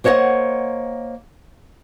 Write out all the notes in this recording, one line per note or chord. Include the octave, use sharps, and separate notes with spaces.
A#3 C5 C#5 D#5 F#5